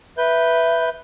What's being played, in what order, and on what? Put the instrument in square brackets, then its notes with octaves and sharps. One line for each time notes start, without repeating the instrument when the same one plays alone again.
[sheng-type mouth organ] B4 G6 [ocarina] E5